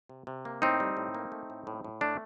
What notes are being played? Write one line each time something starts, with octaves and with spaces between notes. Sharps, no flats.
C3
C3
A#3
A2 C4 D#4
G3
A2
A#3
A3
A2
A2
A2
A3 D4